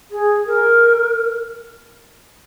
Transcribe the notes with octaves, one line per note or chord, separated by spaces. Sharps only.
G#4
A#4